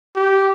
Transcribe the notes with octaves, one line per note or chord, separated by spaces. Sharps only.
G4